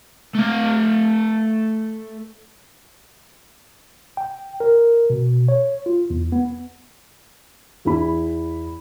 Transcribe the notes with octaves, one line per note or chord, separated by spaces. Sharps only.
A3 F5
G5
A#4
B2
C#5
F4
E2
B3
E2 E4 B5